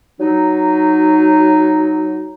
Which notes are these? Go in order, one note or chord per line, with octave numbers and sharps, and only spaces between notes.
F#3 D#4